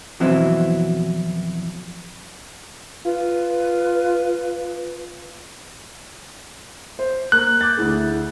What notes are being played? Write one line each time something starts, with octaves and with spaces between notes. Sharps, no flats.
F2 B2 E3 F#3 C4 E4
F4 B4
C5
A#3 F#6
D6 G6 A6
D2 E4 G#4